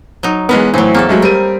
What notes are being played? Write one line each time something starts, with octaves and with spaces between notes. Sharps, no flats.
F#3 D#4
E3 G#3 B3 A#4 B4
A2 E3 F#3 C4
E2 A#3 C#4 A4
F#3 G#3 A3
G3 C4 A#4 D#7